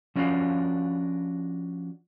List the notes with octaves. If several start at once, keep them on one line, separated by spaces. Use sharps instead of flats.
F3 C#4 D4 F#4 F5